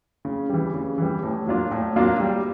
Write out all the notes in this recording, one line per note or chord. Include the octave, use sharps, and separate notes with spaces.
C#3
E3 G3
C#3
E3 G3
A2
F#3 A#3 D4 F4
A2
F#3 A#3 D4 F4
G3